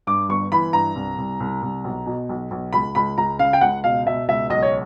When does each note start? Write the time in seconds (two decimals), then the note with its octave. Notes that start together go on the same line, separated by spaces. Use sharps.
0.07 G2 D6
0.29 G1 C#6
0.52 E3 B5
0.73 G2 A#5
0.96 C2
1.18 C2
1.40 C2
1.62 C2
1.84 B1
2.07 B2
2.29 B1
2.51 B1
2.73 C#2 B5
2.95 C#2 B5
3.18 C#2 A#5
3.39 C#3 F5
3.53 G5
3.61 C#2 F#5
3.84 B2 F5
4.07 B2 E5
4.28 C#2 E5
4.50 B1 D#5
4.62 C#5